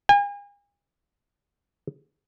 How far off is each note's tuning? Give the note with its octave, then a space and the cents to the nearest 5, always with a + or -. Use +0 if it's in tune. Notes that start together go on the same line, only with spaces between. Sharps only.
G#5 -40